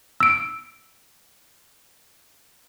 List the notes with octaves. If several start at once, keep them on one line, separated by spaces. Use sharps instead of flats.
E6 D7